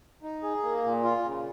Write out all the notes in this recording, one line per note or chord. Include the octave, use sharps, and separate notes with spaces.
D#4
G#4
A#3
A#2
F4
C#3